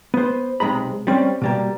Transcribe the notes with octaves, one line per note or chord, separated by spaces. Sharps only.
B3 C5
B1 C3 G#3 A#5 B5
G3 C4 C#4
B2 G3 A#3